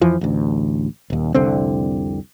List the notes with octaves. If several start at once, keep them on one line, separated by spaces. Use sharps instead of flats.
F2 E3 F3
A1 D2
D#1 D#2
F1 C2 D3 C4